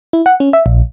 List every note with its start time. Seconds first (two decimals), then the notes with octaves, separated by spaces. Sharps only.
0.13 E4
0.26 F#5
0.40 C#4
0.53 E5
0.66 A#1